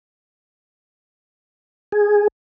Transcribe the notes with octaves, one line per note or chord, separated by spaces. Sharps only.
G#4